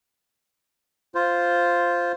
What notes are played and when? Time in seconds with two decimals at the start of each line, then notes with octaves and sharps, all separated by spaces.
1.15 F4 C5